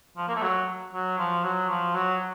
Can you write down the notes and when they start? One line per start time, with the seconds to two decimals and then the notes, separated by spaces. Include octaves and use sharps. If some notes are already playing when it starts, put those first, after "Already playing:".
0.17 F3
0.28 A#3
0.35 A3
0.42 F#3
0.93 F#3
1.18 F3
1.44 F#3
1.69 F3
1.95 F#3